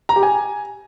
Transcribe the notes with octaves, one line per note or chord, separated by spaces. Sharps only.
A#5
G4
G#5